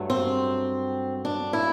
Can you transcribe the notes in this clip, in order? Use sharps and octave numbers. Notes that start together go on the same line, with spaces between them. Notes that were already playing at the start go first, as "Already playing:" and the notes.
Already playing: G2 F#3 A3
C4
D4
E4